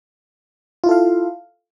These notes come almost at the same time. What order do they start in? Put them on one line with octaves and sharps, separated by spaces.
F4 E4 A4 F5